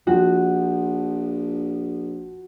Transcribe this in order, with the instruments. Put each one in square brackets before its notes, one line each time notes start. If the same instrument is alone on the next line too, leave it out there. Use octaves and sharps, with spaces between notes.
[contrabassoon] A#1 [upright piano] F3 G5 [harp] F#4